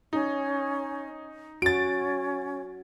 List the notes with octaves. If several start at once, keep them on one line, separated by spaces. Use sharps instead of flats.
C#4 D#4
C#4 F#4 A6 D7